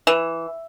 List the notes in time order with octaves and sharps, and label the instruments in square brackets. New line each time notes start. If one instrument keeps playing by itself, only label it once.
[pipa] E3